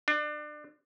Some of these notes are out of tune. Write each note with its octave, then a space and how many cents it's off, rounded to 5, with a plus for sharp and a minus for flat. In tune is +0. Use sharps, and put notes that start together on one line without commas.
D4 +30